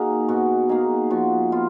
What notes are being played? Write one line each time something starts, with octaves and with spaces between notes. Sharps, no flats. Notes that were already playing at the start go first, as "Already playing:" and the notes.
Already playing: A#3 D#4 F#4 G#4
B2 F#4
A#3 D#4 G#4
F3 F#4
B3 F4